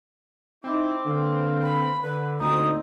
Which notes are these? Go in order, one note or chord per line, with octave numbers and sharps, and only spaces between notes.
C4 D#4 E4 D6
D3 A#3 B4 F5
B5
D3 B4
D2 A#2 C4 D#4 D#6